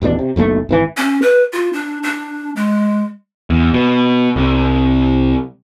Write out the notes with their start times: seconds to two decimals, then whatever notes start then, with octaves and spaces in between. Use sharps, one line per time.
0.02 D#1 A1 B2 D4
0.19 C3
0.36 F#1 B1 B2 A3
0.69 G#1 D#3 E3
0.97 C#4
1.22 B4
1.53 F4
1.73 D4
2.03 D4
2.56 G#3
3.50 E2
3.74 B2
4.36 C2